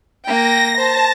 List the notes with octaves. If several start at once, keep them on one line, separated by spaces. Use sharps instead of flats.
A#3 G5 A#6
C5 A5